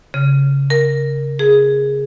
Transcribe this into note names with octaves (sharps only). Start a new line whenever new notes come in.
C#3
A#4
G#4